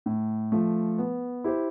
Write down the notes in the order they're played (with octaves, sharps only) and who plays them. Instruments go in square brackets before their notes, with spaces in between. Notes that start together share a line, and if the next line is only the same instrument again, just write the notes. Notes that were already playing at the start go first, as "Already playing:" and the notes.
[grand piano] A2
F3 A3
B3
E4 G4 C5